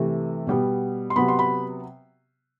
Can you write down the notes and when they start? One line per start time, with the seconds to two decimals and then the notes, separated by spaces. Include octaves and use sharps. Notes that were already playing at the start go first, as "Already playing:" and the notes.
Already playing: C3 E3 A3
0.47 B2 G3 B3
1.10 C6
1.16 C3 F#3 B3 B5
1.28 C6
1.39 B5